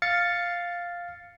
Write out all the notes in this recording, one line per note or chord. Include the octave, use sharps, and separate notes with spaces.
F5 A6 C#7